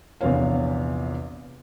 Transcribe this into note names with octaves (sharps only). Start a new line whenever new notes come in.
A#1 E2 C3 B3 C#5 F5